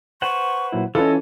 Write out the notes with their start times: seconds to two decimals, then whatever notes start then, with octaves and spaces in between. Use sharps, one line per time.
0.22 B4 C5 F#5 C#6
0.72 A#2 F#3 E4
0.95 E3 C#4 F4 A4 B4 D#5